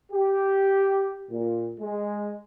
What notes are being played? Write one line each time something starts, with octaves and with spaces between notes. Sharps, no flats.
G4
A#2
G#3